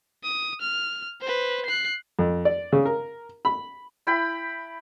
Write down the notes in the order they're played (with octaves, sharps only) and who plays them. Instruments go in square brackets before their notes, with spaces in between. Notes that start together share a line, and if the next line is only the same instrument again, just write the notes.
[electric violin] D#6
F6
B4 C5
F#6 C7
[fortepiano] F2
D5
C#3
A#4
B5
[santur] E4 G5 B5